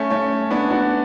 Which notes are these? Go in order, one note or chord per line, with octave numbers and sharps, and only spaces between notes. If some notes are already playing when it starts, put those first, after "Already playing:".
Already playing: A3 C#4
A3 C#4
B3 D4
D4 F#4